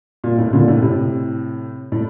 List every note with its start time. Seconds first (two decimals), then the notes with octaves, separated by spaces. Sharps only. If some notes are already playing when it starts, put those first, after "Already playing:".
0.24 A#2
0.38 A2
0.53 A#2 D3
0.68 A2 C3
0.82 A2 C3
1.92 A2